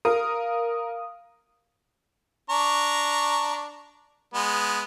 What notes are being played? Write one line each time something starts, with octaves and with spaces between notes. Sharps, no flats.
A#4 F5 D#6
D4 A#5 C#6
G#3 B3